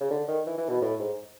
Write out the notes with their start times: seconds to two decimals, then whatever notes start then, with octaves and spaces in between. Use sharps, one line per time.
0.01 C#3
0.11 D3
0.28 D#3
0.47 E3
0.58 E3
0.69 B2
0.82 A2
0.99 G#2